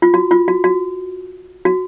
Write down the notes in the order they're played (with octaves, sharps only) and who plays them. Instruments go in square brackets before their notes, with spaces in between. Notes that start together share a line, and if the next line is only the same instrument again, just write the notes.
[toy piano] F4
F#4
F4
F#4
F#4
F#4